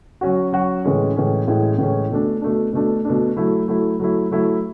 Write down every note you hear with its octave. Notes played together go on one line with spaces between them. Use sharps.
F#3 C#4 F#4
F#3 C#4 F#4
A2 E3 G#3 C#4
A2 E3 G#3 C#4
A2 E3 G#3 C#4
A2 E3 G#3 C#4
B2 A3 D4
B2 A3 D4
B2 A3 D4
B2 A3 D4
F#3 A3 E4
F#3 A3 E4
F#3 A3 E4
F#3 A3 E4